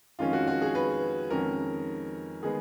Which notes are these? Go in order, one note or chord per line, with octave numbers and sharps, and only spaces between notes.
F2 D#3 G#3 C#4 F4
F#4
F#4
G#4
B4
F2 D#3 G#3 C#4 A#4
D#3 G#3 B3 G#4